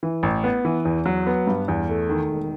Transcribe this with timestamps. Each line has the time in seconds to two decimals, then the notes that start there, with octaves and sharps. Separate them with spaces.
0.03 E3
0.23 A1
0.44 B3
0.65 E3
0.85 E2
1.06 F#3
1.27 B3
1.47 G2
1.68 E2
1.89 A3
2.09 D#3
2.29 E1